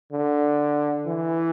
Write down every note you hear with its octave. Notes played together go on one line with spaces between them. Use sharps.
D3
E3